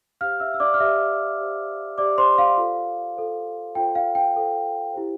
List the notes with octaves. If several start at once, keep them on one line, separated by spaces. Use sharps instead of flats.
G4 C5 F5 F6
E5 E6
E6
D5 D6
F6
G4 C5 E5 E6
G4 C5
G4 C5 D5 D6
C5 C6
F5
F4 A4 C5
F4 A4 C5
F4 A4 C5 G5
F5
G5
F4 A4 C5
E4 G4 C5